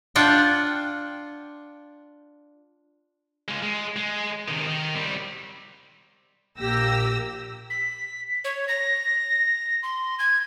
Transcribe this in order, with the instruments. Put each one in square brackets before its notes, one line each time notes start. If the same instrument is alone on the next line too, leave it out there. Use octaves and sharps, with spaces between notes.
[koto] D4 F4 F#5 G5
[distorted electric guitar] G#3 F4
G#3
G#3
C3 D#3
D#3
G3 C4
[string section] A#1 A#3 G4 E6 A#6
[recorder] B6
C#5
A#6
C6
G#6